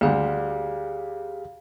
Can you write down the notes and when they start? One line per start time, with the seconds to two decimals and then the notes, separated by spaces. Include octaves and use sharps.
0.01 D2 D3 G3 G4 G#4 F5